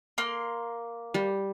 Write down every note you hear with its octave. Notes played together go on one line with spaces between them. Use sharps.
A#3 C6
G3